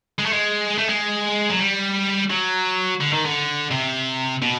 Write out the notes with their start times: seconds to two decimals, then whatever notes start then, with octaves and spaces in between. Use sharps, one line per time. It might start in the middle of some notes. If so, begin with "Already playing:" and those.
0.19 G#3
0.26 A3
0.33 G#3
0.78 A3
0.89 G#3
1.50 F#3
1.59 G3
2.30 F#3
3.01 D3
3.13 D#3
3.26 D3
3.71 C3
4.42 B2